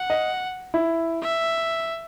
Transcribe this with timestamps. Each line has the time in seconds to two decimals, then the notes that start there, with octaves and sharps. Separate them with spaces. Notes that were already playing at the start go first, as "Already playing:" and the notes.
Already playing: F#5
0.10 D#5
0.74 E4
1.22 E5